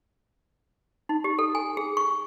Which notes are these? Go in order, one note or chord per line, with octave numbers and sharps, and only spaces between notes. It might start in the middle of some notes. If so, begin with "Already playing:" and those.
D#4
G4
A4
G#5
G#4
C#6